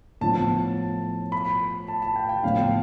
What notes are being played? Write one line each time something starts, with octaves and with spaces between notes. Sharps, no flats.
A2 F3 B3 A5
B5
A5
A5
G5
G5
A2 F3 B3 F4 F5